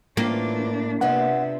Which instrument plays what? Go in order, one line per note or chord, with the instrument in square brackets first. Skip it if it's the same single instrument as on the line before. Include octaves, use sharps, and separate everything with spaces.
[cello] A2 D4 [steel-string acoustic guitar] E3 C#4 F4 [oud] A#3
[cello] C3 E5 [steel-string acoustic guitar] B3 D4 F4 [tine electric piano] F#5